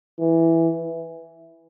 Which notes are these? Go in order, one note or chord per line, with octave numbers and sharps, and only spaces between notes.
E3